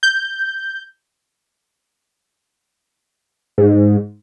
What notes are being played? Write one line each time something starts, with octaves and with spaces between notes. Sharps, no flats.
G6
G#2